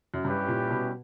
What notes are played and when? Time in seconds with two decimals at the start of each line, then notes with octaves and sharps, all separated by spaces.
0.14 F#2
0.25 G2 G3 C#4 E4 G4 B4
0.48 A#2
0.71 B2